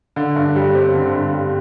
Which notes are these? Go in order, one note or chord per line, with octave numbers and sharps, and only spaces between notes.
D3
G2
G3
C4
D3
G2
G3